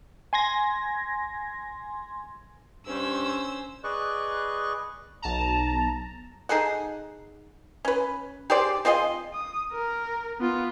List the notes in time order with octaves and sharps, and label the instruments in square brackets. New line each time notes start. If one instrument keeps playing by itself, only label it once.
[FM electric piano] G#5 C6 G#6 A#6
[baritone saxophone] G2 [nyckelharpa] C#4 C5 [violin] E6
[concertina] G#4 B4 D5 D#5 C#6 F#6
[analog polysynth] B1 A5 A#5
[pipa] D#4 G#4 A4 F#5
C#4 B4
G4 G#4 C5 D5
C4 F4 G#4 D#5
[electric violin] D#6
A#4
B3 F4